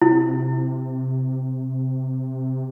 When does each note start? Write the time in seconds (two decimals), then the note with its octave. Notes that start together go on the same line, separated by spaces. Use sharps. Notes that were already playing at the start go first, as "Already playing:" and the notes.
0.02 C3 E4